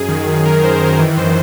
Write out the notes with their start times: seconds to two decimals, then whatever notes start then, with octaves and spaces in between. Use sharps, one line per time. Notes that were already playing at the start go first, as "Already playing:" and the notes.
Already playing: F#2 G#4
0.09 D#3
0.26 F#2
0.45 D#3 A#4
0.63 F#2 C5
0.81 D#3 C5
0.99 E3
1.17 F#2 C5